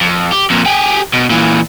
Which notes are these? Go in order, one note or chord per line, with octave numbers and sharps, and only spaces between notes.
F2
G4
F2 A#2
G4 G#4
B2
A#2 E3